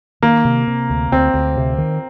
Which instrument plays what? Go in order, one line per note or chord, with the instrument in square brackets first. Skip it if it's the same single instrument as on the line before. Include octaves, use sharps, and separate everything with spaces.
[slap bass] D#3 [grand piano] A#3
[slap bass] C3
C3
D2
[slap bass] D2 [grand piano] C4
[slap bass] D2
C3
D#3